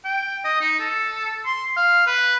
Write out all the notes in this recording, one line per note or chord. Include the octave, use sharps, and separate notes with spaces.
G5
D#5
D#4
A4
C6
F5
B4